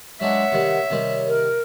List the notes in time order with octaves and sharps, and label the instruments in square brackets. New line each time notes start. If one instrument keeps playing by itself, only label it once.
[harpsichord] F#3 G#3 D4 [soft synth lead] C#5 [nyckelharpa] E5 [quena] F#5
[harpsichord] C3 D#3 G3
C3 D#3 G3
[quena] A#4